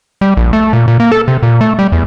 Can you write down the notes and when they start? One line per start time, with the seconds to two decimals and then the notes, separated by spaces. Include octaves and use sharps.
0.21 G3
0.37 A#1
0.53 A3
0.73 A#2
0.88 A#2
1.00 A#3
1.12 A4
1.28 C3
1.43 A#2
1.61 A3
1.79 G3
1.92 E2